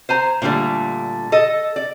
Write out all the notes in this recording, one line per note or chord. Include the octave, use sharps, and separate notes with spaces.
C5 G#5 A#5
A#2 D3 F#3 G3 A3
A4 D#5
D5